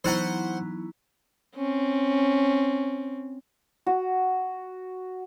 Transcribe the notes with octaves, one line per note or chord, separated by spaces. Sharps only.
E3 F#3 B3 D#4 E4 C5 F#5 A#5
C4 C#4
F#4